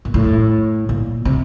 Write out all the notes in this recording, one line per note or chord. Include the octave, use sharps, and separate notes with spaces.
A#2
A2
A#2
C3